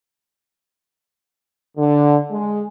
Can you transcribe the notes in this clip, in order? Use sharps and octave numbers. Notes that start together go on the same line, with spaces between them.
D3
G#3